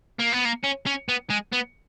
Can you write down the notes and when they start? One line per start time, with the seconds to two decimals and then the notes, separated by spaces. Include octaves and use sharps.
0.19 A#3
0.32 B3
0.45 A#3
0.64 C#4
0.86 C#4
1.09 B3
1.30 G#3
1.52 B3